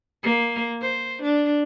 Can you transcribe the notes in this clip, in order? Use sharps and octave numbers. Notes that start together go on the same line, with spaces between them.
A#3
C5
D4